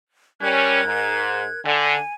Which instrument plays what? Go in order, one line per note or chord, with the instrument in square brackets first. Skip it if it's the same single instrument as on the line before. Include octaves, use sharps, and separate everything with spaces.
[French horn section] G3 C#4 [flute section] A#4 F#6 G#6
[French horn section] G#2
[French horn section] D3 [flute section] G#5